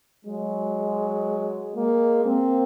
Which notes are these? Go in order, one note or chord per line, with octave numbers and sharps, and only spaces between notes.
F#3 G#3
G#3 A#3
A#3 C4